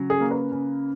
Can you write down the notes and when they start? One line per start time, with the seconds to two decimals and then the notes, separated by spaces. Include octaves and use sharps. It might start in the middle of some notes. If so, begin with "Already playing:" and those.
Already playing: C#3 F#3
0.10 G#4
0.20 A#3
0.31 B4
0.52 C#3